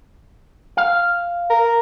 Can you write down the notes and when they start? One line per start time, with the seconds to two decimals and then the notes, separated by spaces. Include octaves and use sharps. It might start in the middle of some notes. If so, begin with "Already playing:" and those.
0.77 F5
1.50 A#4